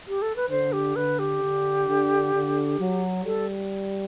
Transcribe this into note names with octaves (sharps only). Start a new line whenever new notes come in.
G4
A4
B4
D3 C5
G4
D3 B4
G4
D3
D3
D3
F#3
G3 A4